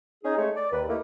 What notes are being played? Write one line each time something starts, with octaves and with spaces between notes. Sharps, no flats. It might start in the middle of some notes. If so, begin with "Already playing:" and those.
C#4 D#4 G#4
G#3 A3 C#5
D5
D#2 B4
A3 A#3 D#4 E4 G4 A#4